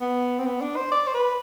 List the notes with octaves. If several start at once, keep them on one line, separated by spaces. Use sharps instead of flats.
B3
C4
B3
D4
C5
D5
C5
B4